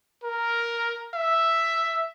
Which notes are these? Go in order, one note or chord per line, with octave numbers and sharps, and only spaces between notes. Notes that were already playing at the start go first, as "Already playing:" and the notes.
A#4
E5